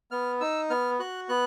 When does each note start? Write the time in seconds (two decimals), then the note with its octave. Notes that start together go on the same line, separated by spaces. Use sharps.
0.11 B3 F6
0.41 D#4 E6
0.70 B3 F6
0.99 F#4 F#6
1.29 B3 F#6